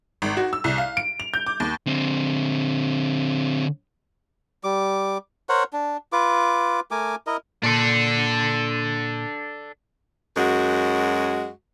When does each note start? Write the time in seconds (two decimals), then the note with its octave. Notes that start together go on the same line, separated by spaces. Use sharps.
0.22 G#1
0.37 F#4
0.53 E6
0.64 C2
0.78 F5
0.97 D7
1.20 F7
1.34 G6
1.47 D6
1.60 D#2
1.86 D3 C4
4.64 G3 D6
5.49 A#4 C5 C#5 F#5
5.73 D4
6.12 F4 B4 D6
6.91 A3 A#4 G#5 D6
7.27 E4 A#4 D#5
7.63 A#2 D4 A4
10.37 F#2 G#3 F#4